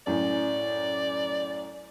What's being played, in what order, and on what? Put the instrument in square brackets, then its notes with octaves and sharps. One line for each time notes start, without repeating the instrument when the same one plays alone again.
[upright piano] F#2 A2 C#4 [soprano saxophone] D5